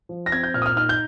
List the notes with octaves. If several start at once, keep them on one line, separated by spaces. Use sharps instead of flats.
F3
A#6
C4 G#6
G6
A#2 F6
D#6
F6
D#4 F6
G6